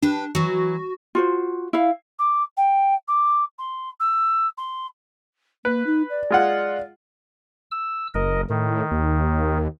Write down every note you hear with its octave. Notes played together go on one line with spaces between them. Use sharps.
D4 G4 B4
E3 F#3 F#4
F4 F#4 C5
E4 F5
D6
G5
D6
C6
E6
C6
A#3 B4
D#4
D5
G#3 F4 F#5
E6
F#1 A#4 D#5
A2 D#3
D#2